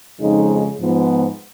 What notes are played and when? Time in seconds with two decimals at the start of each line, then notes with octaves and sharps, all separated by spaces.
0.20 F2 C#3 F3 G#3 D#4
0.78 G#2 F3 B3